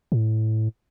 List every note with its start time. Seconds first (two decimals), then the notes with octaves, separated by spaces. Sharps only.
0.12 A2